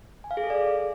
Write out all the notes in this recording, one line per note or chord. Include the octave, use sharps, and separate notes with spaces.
G#5
F5
G#4
A4
D5